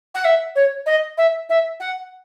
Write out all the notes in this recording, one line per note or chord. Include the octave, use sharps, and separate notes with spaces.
F#5
E5
C#5
D#5
E5
E5
F#5